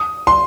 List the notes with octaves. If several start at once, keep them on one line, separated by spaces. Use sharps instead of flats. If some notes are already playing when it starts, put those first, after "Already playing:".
Already playing: D#6
C6